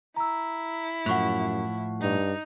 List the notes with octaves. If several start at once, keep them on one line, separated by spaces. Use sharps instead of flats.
E4 A#5 E6
F#2 A2 F3 F#5 C#6 F#6
G2 D#4